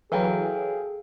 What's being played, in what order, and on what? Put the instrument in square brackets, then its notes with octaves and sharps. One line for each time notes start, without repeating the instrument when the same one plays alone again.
[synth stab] E3 F#3 [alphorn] G#4 [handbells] A4 F5 G5